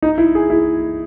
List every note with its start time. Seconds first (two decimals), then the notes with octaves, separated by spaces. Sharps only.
0.02 D#4
0.18 E4
0.35 G#4
0.50 E4